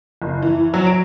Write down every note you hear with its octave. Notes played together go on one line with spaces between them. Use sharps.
F#1
E3
F#3
D7